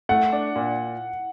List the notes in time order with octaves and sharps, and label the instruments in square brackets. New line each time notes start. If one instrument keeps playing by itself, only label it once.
[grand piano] A3 [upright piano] F#5
[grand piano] D4
A#2